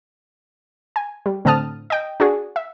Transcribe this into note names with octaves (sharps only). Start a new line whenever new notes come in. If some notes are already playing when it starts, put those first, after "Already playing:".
G#5
G3
A2 D3 C4 A5 D#6 F6
D#5 G5
D4 F#4 G#4
E5